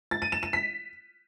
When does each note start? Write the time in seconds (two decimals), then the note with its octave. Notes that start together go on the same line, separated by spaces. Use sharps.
0.11 A6
0.22 D#7
0.32 E7
0.43 E7
0.53 B6